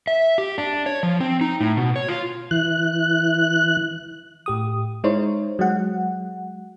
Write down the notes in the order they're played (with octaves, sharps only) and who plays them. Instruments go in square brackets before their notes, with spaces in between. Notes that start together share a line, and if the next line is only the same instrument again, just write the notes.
[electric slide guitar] E5
G4
D4
C#5
F3
C4
D#4
A2
B2
C#5
F4
[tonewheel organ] E3 F#6
[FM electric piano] A2 G4 D#6
G#3 D#4 E4 C5 C#5
F#3 G#3 F#5